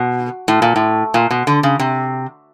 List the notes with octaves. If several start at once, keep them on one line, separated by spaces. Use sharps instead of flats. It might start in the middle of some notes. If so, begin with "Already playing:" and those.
Already playing: B2
A2
A#2
A2
A#2
B2
D3
C#3
C3